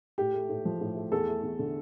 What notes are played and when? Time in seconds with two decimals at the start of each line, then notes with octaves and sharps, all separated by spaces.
0.18 A2 G4
0.34 A3
0.49 A2
0.65 F3
0.81 A2
0.96 A3
1.12 E2 A4
1.28 A3
1.43 E2
1.59 D3